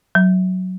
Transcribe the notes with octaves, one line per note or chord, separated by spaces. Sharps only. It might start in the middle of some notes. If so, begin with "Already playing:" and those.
F#3